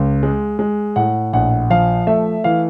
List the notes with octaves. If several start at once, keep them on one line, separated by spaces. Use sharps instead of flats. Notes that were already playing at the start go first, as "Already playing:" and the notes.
Already playing: C#2
G#3
G#3
A2 F#5
A#1 F#5
F3 F5
A3 E5
E3 F5